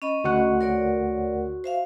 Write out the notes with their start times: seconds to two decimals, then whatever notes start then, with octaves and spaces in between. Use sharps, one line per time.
0.02 C#4 D#5 B5
0.24 D2 F#4 F#5 C#6 F#6
0.61 A#4 C#5 D5
1.64 C5 E5 F5